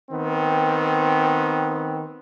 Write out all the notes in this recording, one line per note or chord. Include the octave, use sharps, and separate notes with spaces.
D#3 B3 C4